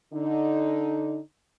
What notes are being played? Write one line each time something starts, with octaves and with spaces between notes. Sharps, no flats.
D3 D#4